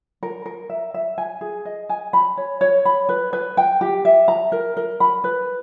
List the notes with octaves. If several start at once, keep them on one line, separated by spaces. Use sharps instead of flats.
A#4
A#4
E5
E5
G#5
G#4
D#5
G#5
B5
C#5
C#5
B5
B4
B4
G5
G4
E5
A#5
A#4
A#4
B5
B4